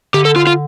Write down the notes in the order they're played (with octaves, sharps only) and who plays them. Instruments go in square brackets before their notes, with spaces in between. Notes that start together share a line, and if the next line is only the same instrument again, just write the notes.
[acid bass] D3 [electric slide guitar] G4
[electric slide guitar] A4
F4
F4